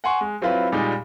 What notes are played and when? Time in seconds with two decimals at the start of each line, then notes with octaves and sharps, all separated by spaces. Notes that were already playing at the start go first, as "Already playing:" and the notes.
0.04 F#5 G#5 C6 C#6
0.21 G#3
0.42 F#3 C4 E4 F4 B4
0.72 A#2 G3 G#3 D#4